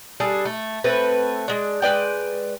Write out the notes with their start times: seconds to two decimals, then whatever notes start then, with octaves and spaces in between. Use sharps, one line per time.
0.20 G3 D4 G#4 A4
0.45 A3
0.84 A3 C4 B4
1.48 G#3 D4
1.82 G#3 B4 D5 G5